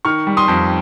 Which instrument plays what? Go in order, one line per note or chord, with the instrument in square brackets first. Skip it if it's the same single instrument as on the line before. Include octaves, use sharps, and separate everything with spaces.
[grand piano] D#3 C#6 F6
G3
C6 D#6
F2